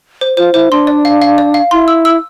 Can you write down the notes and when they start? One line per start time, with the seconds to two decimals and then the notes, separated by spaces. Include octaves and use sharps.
0.21 C5
0.37 F4 C5
0.54 E4 C5
0.71 D4 C6
0.87 D5
1.05 F5
1.22 F5
1.38 D5
1.54 F5
1.71 E4 C6
1.88 E6
2.05 E6